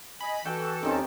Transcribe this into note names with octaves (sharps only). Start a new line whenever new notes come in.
D#5 G#5 B5
E3 F#4 A4 G5
D#2 C3 D#3 C4 C#4 D#4